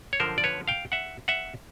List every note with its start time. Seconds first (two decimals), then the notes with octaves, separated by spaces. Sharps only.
0.13 C#5
0.20 F#2 D3 F3 A#4 C5
0.38 D5
0.44 B4 C#5
0.68 F5 G5
0.92 E5 F#5
1.28 E5 F#5